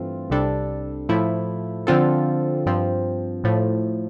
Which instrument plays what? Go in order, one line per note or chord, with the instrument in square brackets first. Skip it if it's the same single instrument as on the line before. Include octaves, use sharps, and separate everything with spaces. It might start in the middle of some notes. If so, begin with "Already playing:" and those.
Already playing: [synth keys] G2 E3 A3 C4 F4
C2 C3 G3 D4 A4
A2 F3 A3 E4
D3 F3 C4 F4 A4
G2 F3 C4
A2 F3 A3